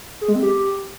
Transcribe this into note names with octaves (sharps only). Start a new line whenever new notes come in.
G#4
G#3
C4
G4